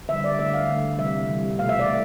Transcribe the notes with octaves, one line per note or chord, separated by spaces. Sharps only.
D3 G3 E5
D5
D3 A3 E5
F5
D3 A3
C3 E3 G3 E5
C3 E3 G3
B2 A3 F5
E5
D5
A3